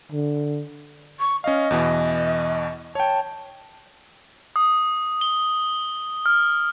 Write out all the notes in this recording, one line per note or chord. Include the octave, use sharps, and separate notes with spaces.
D3
C#6
C#4 D#5 F5
E2 B2 E3
C#5 G5 A5
D#6
G7
F6